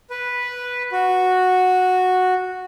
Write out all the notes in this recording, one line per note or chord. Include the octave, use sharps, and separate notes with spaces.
B4
F#4